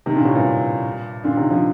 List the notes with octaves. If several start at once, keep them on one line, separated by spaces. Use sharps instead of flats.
C3 D#3
A#2 D3
A2 C3
G2 A#2
A#2 D3
C3 D#3
D3 F3